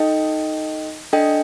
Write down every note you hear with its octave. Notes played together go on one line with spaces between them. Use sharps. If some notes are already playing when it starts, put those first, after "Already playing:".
Already playing: D#4 A4 D#5 G5
D4 A4 D#5 G5